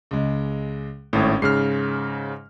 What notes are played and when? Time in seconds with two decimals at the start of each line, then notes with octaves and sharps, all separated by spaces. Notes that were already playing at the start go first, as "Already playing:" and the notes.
0.11 C#2 G#3
1.13 G#1 A2 C#4
1.42 G#2 C#3 F6 C7